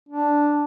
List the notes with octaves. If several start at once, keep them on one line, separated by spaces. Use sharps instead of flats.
D4